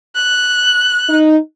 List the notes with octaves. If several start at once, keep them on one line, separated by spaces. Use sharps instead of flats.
F#6
D#4